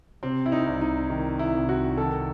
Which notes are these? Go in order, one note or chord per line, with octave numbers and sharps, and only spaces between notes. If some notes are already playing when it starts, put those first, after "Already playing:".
C3 C4
E4
D#4
C2
D#4
D#3
E4
C2
F#4
D#3 A4